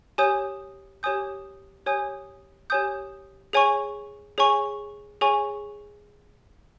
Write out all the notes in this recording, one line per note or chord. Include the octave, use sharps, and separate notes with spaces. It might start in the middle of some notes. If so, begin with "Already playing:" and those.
G4 C#5 G#5 D#6 G6
G4 C#5 G#5 D#6 G6
G4 C#5 G#5 D#6 G6
G4 C#5 G#5 D#6 G6
G#4 C#5 G#5 C#6
G#4 C#5 G#5 C#6
G#4 C#5 G#5 C#6